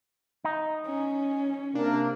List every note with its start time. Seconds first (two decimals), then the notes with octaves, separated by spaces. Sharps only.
0.44 D#4
0.86 C#4
1.75 C3 A#3 D4